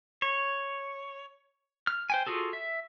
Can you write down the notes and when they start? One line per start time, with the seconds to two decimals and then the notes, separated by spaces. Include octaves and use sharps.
0.22 C#5
1.87 F6
2.10 C5 G5 G#5
2.27 F4 F#4 G#4 A4
2.53 E5